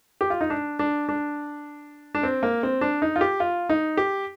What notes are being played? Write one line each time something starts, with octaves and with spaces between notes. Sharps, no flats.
G4
F4
D#4
D4
D4
D4
D4
C4
A#3
C4
D4
D#4
F4
G4
F4
D#4
G4